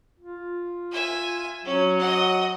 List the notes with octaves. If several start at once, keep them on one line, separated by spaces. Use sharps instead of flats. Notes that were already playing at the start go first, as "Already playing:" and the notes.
F4
E5 G#5
F#3 C#4
D#5 F#5